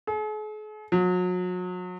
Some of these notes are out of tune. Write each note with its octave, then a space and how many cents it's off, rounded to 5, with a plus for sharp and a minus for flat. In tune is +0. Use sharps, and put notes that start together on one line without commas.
G#4 +45
F#3 -35